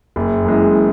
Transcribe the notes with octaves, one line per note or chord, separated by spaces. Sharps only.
F#1
F#2 E3 G#3